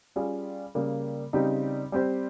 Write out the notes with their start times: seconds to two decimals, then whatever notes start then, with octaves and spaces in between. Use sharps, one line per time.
0.16 G3 C#4 F4 G#4
0.75 C#3 G3 A#3
1.33 C#3 G3 C4 D#4 G4
1.92 G3 C4 G4 C5